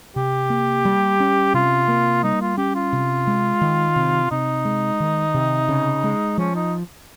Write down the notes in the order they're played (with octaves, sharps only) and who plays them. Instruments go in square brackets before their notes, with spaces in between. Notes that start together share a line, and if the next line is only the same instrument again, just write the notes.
[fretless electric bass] C3 [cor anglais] G4
[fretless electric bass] A#3
G3
C#4
[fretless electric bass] C3 [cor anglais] F4
[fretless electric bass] A#3
[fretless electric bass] G3 [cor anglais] D#4
[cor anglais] F4
[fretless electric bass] C#4 [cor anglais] G4
[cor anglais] F4
[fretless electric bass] C3
G#3
D#3
C3
[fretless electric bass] C3 [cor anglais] D#4
[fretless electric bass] G#3
D#3
C3
C#3
G#3
[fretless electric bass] F3 [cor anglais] C#4
[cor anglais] D#4